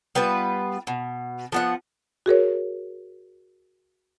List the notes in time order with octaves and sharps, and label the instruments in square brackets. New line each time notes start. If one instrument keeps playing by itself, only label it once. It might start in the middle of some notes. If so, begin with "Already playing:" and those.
[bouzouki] G3 B3 F4 B4
B2
F3 B3 F#5
[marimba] F#4 G#4 A#4 C#5